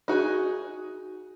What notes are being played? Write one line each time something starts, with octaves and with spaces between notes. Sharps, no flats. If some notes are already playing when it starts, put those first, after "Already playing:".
D#4 F#4 G#4